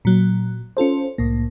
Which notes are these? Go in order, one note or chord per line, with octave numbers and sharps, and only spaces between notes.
A#2 F#3
C#4 F4 A4 C5
C2 A2 A#3